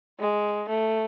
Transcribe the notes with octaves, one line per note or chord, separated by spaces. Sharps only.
G#3
A3